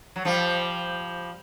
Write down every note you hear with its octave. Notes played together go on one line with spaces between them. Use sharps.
F#3
F3 G3